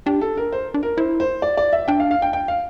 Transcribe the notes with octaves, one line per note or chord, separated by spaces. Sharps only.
D4 G4
A4
A#4
C5
D4
A#4
E4 C5
C5
D5
D5
E5
D4 G5
F5
F5
G5
G5
F5